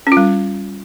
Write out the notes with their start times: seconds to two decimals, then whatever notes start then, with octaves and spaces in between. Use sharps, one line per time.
0.07 C#4
0.12 F4
0.17 G3